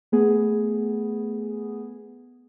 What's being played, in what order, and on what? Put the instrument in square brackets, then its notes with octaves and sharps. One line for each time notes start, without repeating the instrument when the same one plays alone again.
[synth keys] A3 B3 G#4